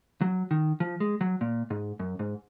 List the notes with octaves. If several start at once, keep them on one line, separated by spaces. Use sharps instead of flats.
F#3
D#3
F3
G#3
F#3
A#2
G#2
F#2
G#2